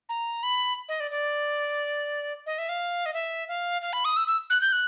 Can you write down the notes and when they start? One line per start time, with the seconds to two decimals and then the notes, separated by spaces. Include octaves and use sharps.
0.09 A#5
0.43 B5
0.89 D#5
1.00 D5
1.11 D5
2.46 D#5
2.58 E5
2.69 F5
3.06 D#5
3.14 E5
3.48 F5
3.82 F5
3.93 B5
4.05 D#6
4.17 E6
4.27 E6
4.50 F#6
4.61 G6
4.72 F#6